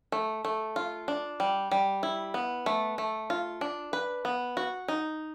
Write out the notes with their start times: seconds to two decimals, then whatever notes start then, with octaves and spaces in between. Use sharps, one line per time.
0.12 A3
0.45 A3
0.76 F4
1.08 D4
1.40 G3
1.71 G3
2.03 E4
2.34 B3
2.66 A3
2.98 A3
3.30 F4
3.61 D4
3.93 B4
4.25 B3
4.57 F#4
4.88 D#4